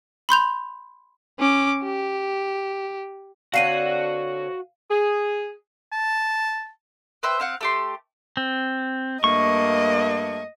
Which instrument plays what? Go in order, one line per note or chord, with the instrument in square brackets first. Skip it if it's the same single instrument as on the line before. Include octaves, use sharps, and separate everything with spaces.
[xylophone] B5 C6 G6 F7
[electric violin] C#4 D6
G4
[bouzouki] D3 C4 C#5 [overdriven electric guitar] F#4 F#5 [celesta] F5 C7 D#7
[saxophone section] G#4
[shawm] A5
[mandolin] B4 C5 E5 G5
C4 F5 F#5
A3 G4 C6
[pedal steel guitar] C4
[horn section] G2 A3 A#3 [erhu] D#5 [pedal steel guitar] C#6